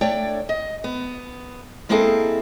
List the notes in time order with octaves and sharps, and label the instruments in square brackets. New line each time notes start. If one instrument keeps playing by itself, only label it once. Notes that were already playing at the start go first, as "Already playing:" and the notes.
[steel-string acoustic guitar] A3 D4 C#5 D5 G5
D#5
B3
G#3 A#3 C4 E4 G#4 A4